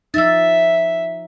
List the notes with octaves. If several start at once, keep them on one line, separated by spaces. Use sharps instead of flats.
F3 D#4 E5 E6 A6